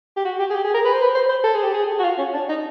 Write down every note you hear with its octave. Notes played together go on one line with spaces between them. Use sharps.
G4
F#4
G4
G#4
G4
G#4
A#4
B4
C5
B4
C5
C5
A4
G#4
G4
G#4
F#4
F4
C#4
D4
D#4